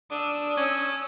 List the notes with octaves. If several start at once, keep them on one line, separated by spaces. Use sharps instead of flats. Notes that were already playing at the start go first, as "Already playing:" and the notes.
D4 D#6 E6
C#4